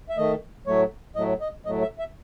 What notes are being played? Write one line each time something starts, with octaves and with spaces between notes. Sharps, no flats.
E5
D#3 A3 D#5
A2 F#3 A3 C#5
A2 F#3 A3 D#5
D#5
A2 F#3 A3 D#5
E5
E5